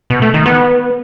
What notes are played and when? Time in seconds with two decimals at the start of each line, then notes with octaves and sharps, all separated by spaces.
0.10 B2
0.22 A3
0.34 D#3
0.46 B3